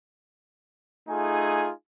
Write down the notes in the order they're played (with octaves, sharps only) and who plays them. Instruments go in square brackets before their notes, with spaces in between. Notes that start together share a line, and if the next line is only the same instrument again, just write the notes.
[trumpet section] A3 D#4 F4 G#4 G#5